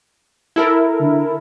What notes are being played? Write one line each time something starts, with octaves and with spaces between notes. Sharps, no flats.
E4 A4 A#4
D3